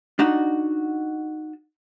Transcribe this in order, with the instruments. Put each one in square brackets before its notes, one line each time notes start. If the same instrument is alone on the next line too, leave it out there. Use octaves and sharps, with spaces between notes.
[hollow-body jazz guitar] D4 D#4 F#4